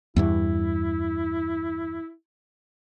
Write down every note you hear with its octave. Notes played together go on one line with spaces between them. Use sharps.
E2 G2 E3 E4